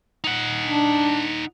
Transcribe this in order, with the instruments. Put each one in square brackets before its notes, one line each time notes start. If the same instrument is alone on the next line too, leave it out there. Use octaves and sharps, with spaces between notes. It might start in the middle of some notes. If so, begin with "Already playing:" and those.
[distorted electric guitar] D#4 F#5
[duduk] D4